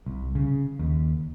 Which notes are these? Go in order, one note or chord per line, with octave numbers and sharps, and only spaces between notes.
C2
C#3
D#2